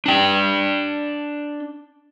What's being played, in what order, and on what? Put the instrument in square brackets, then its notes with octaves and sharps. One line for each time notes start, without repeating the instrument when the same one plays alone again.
[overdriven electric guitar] D4 G5